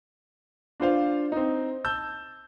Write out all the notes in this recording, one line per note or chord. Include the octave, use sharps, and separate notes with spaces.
D4 F4 C5 F5
C4 D#4
A5 E6 G6